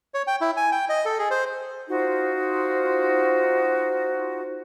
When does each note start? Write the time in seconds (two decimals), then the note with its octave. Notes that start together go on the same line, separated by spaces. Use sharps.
0.14 C#5
0.27 G5
0.41 E4
0.57 G#5
0.72 G5
0.89 D#5
1.05 A4
1.19 G#4
1.31 C5
1.89 D#4 F4 F#4 C5